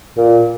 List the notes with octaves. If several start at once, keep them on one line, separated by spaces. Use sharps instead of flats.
A#2